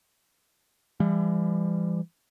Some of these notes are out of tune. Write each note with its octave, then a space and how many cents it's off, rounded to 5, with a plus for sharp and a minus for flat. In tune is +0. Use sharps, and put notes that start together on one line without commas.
E3 +45 G3 +35